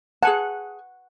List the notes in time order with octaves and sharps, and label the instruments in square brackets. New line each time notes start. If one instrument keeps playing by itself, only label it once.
[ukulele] G#4 G#5 A5 [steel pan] F#5